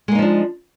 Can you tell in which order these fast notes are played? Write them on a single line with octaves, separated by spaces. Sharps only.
G#3 A#3 D#4 F3 D4